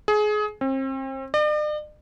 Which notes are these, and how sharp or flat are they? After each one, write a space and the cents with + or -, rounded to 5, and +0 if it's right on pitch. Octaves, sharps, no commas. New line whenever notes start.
G#4 +25
C4 +35
D5 +45